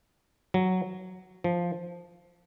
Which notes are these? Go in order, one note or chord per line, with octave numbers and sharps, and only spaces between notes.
F#3
F3